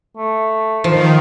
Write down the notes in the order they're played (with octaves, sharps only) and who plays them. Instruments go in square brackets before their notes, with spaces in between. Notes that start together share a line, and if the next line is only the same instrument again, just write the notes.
[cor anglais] A3
[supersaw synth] D#3 [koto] F3